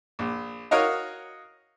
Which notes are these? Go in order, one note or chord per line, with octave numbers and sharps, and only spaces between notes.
A#1
F#4 A#4 C#5 D#5 F5